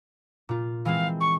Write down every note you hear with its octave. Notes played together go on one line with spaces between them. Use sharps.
A#2 F4
E3 G#3 C4 F5
C#6